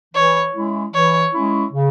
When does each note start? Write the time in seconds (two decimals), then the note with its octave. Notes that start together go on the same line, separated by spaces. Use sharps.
0.14 E3 C#5
0.55 G#3 C#4 E4
0.94 E3 C#5
1.33 G#3 C#4 E4
1.72 C#3